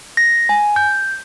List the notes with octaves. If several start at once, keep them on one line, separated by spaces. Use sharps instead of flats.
A#6
G#5
G6